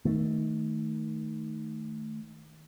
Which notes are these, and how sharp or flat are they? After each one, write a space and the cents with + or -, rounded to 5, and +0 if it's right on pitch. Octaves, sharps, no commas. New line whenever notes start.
D#3 +5 A3 +0